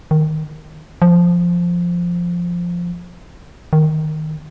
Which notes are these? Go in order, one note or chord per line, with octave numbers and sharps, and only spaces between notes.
D#3
F3
D#3